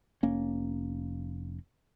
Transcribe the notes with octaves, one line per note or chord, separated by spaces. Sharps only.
F1 A#3 C#4